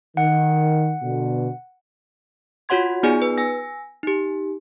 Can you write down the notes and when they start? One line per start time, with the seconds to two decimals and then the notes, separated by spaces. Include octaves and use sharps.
0.17 D#3 F#5
1.03 B2 D3
2.69 F4 F#4 C#5 F#5 C6 G#6
3.03 B3 D#4 F4 G#4 D5 G#5
3.22 B4
3.38 G#5 E6 A#6
4.03 D#4 G4